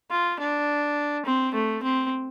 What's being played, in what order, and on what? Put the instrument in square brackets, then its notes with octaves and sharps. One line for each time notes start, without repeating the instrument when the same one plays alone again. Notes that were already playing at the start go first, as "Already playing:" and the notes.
[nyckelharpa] F4
D4
C4
A3
C4